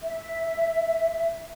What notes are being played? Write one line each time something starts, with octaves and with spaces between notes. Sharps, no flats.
E5